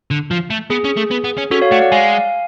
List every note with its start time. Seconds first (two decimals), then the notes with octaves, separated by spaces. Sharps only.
0.11 D3
0.31 F3
0.50 A3
0.70 B3 G#4
0.85 C#4
0.97 A3
1.11 B3
1.24 B3
1.38 C#4
1.51 C#4 F#4 A4
1.62 C#5 F5
1.71 A3 D5 F#5
1.81 D5 F#5
1.92 G#3 F5 G#5